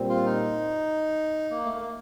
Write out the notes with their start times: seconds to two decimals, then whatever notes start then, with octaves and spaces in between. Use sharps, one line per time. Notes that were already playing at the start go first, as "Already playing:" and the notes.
Already playing: A#2 G3 C4
0.09 F4
0.25 D#4
1.51 A#3
1.64 A3
1.73 A#3